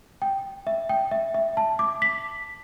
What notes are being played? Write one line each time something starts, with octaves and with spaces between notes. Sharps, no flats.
G5
E5
G5
E5
E5
A5
D6
B6